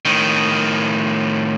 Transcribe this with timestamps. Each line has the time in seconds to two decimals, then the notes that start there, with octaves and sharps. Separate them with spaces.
0.05 A2 D#3